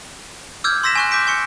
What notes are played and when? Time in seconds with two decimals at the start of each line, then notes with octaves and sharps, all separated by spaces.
0.64 D6 E6 F6 G6 G#6
0.83 C6 E6 A#6 B6 E7
0.95 G#5 C#6 F#6
1.11 D6 G6 B6 D7
1.27 G#5 C#6 C#7